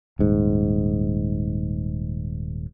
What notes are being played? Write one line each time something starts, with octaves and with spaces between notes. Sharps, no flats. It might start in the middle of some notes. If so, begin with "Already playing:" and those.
D#1 G#2